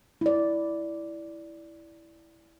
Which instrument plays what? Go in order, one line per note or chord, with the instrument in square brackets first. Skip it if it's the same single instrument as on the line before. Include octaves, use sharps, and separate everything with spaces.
[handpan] E4 D5